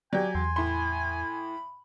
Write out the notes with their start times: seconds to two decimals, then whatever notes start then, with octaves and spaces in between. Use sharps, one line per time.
0.13 F#3 G4 D5 G#5
0.35 E2 C6
0.56 A2 B5 C6